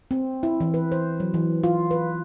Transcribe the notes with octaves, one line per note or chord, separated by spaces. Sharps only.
C4
E4
E3
B4
C5
F#3
E3
F4
B4